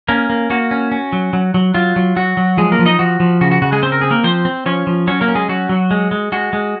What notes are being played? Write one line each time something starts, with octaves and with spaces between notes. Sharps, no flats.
A#3 C#4 A#4
A#3
A#3 F#4
C#4
C#4
F#3
F#3
F#3
F#3 F4
F#3
F#3 F#4
F#3
F3 G#3 G#4
A#3 A#4
F3
D#4 D#5
F3 F#4
F3
C#3 F#4
F#4
C#3 F#4
G#3 G#4
C4 C5
A#4
C4 G#4
A#3 A#4
F3 C4 C5
C4
F3 C#4 C#5
F3
F#3 C#4 C#5
A#3 A#4
C#4
G#3 G#4
F#3 F#4
F#3
G#3
G#3
G#3 F#4
G#3